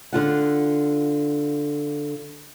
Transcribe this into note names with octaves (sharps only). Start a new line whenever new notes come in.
D3 F4 F#5